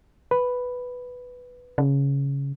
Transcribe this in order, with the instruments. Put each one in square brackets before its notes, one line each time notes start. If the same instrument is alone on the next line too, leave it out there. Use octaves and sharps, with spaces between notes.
[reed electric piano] B4
[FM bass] C#3